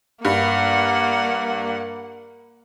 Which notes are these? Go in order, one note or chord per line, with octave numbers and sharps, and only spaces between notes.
G2 A#3 F#5